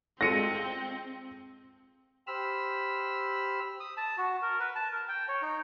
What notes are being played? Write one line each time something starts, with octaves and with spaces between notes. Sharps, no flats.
G#3 C4 F4 A4 A#6 C#7 D#7
G4 C5 B5 E6 F6
D#6
A5
F#4
A#4
B4
A5
A#4
G5
C#5
D#4